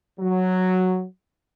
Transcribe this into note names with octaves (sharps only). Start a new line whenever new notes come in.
F#3